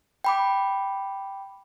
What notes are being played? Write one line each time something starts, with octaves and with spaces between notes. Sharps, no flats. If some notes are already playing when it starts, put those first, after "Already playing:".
G5 B5 D6